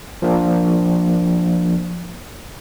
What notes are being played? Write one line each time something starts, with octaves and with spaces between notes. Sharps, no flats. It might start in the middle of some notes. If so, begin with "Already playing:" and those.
F3 A#3 D4